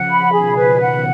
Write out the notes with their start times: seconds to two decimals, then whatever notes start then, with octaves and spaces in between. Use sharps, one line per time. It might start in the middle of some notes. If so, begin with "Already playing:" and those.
Already playing: C#3 F3 F#5
0.10 B5
0.32 B2 D#3 G#4
0.56 B4
0.81 F#5